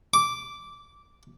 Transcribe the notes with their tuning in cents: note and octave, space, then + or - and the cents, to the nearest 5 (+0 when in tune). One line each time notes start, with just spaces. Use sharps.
D6 -10